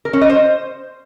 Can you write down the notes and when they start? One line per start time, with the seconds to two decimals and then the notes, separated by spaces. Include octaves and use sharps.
0.05 A#4
0.13 C#4
0.21 D#5
0.30 C5